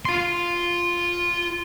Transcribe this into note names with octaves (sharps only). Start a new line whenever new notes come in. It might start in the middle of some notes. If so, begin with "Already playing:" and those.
F4 C6